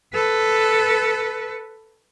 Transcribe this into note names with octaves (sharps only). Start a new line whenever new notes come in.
A4 B4